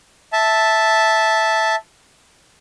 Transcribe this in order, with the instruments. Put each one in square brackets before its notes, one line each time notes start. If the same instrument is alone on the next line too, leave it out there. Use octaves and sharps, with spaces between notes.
[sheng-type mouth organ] E5 A5